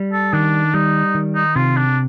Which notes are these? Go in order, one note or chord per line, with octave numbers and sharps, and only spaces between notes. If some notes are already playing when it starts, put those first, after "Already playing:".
Already playing: G3
A4
D#3 D4
G3 D#4
D#3
D#4
C3 F4
D4